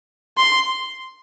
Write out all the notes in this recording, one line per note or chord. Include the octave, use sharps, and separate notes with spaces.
C6